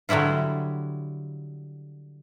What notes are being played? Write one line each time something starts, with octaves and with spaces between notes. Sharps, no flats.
D3 F#3 G3 E4 F4